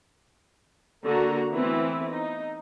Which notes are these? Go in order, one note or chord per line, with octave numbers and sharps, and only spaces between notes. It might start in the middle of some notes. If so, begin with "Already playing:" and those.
D3 A#3 F#4 A#5
E3 A3 B3 C4 E4 B4
D#4